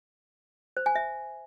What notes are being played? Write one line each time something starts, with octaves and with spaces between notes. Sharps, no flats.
C5
G#5
E5